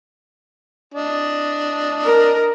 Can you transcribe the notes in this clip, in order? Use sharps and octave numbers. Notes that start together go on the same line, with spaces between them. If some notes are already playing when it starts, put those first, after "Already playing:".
D4 D#5
A#4